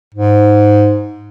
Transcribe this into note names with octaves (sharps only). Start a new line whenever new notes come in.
G#2